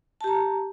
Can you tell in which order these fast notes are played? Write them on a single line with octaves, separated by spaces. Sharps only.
A5 G4 A#5